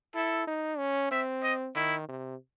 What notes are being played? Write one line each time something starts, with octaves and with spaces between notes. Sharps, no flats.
E4 A4
D#4
C#4
C4 E5
D#5
D#3 E4
C3